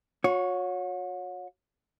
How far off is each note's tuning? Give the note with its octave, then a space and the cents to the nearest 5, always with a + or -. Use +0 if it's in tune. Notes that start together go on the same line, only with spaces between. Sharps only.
F#4 -40 C#5 +0